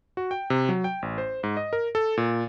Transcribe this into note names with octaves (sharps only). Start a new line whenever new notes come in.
F#4
G5
C3
F#3
G5
A1
C5
G#2
D#5
A#4
A4
A#2